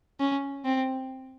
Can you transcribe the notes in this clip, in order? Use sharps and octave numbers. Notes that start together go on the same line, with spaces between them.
C#4
C4